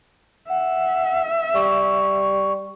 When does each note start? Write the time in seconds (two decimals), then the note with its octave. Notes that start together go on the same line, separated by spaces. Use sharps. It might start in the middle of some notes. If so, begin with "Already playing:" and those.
0.49 E5 F#5
1.55 G3 C#6